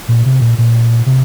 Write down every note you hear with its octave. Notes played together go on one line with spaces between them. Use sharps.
A#2
C3
A#2
A#2
C3